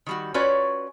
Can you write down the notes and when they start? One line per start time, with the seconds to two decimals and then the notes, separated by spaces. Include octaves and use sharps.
0.06 D#3 G3 F#4
0.34 C#4 F4 F#4 B4 C#5 D5